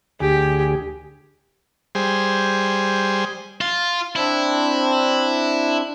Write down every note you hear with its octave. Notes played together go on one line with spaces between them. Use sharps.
D2 G4 G#4
G3 G#4 C5
F4
C4 D4 E4